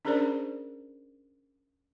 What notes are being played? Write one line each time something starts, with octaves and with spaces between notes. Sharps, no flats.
C#4 D4 G#4 A#4 C5 D5